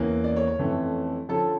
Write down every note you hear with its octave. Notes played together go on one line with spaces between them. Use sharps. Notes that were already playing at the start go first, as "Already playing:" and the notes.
Already playing: E2 E3 A#3 C#4
D5
C#5
C#5
F2 E3 A3 C#4
D3 F3 C#4 A4